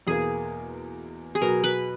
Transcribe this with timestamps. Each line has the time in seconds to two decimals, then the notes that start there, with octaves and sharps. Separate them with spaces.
0.07 E2 B2 A#3 G#4
1.35 G#4
1.41 B2 F#3 B3 F#4 A#4
1.64 B4